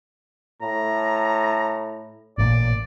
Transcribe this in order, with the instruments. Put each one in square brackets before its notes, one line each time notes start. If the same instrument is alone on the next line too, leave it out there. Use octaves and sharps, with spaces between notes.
[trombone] A2 [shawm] A#5
[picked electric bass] A1 A#2 [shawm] D5